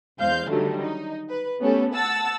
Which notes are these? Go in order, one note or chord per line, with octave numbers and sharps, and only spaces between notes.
E2 G#3 C5 F5 G6
D3 D#3 F#3 G3 A3
D#4
B4
A3 B3 C#4 G4 A4
F#5 A5 E6 A6